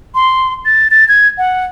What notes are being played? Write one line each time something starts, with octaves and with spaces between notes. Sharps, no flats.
C6
A6
A6
G#6
F#5